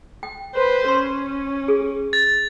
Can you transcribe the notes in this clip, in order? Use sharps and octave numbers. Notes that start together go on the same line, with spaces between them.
G5
B4 C5
C#4 C6
G#4
A6